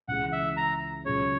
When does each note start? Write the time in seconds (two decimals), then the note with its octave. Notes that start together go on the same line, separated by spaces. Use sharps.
0.08 C#2 C#3 E3 G#3 F#5
0.32 E5
0.57 A#5
1.06 C#2 C#3 F#3 C#4 G#4 C#5